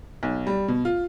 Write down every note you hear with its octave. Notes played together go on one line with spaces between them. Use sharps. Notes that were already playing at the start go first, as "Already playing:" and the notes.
B1
G3
B2
F4